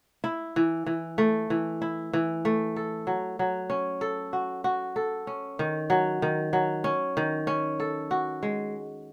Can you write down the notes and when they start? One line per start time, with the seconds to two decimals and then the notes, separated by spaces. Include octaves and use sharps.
0.24 E4
0.56 E3
0.86 E3
1.18 A3
1.50 E3
1.82 E4
2.13 E3
2.45 A3
2.76 A4
3.07 F#3
3.39 F#3
3.70 C#4
4.01 A4
4.33 F#4
4.64 F#4
4.96 A4
5.27 C#4
5.59 D#3
5.90 F#3
6.22 D#3
6.53 F#3
6.84 C#4
7.17 D#3
7.47 C#4
7.80 A4
8.11 F#4
8.43 G#3